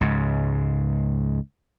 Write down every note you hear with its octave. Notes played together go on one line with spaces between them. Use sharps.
C#2 G#2